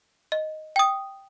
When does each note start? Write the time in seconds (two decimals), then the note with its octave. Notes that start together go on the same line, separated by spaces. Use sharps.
0.32 D#5
0.76 G5 D#6